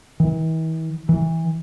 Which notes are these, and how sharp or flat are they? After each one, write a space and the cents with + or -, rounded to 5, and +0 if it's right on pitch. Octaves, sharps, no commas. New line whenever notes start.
E3 -45
E3 -20